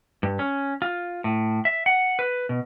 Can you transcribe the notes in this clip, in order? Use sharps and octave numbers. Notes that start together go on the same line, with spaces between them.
G2
C#4
F4
A2
E5
F#5
B4
B2